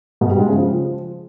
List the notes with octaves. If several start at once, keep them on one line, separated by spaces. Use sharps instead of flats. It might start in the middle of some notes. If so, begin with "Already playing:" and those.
B2
G3
G#3
C#3
F3